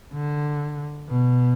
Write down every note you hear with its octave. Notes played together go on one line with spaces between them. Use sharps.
D3
B2